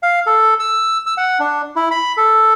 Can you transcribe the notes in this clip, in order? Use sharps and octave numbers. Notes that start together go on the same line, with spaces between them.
F5
A4
E6
E6
F#5
D4
E4
B5
A4